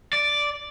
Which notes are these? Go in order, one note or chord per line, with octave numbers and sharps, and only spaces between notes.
D5